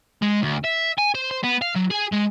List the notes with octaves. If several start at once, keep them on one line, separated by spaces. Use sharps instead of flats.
G#3
D2
E5
G#5
C5
C5
B3
F5
F#3
G#4
G#3